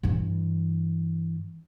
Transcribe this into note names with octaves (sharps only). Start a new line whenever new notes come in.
G2 E3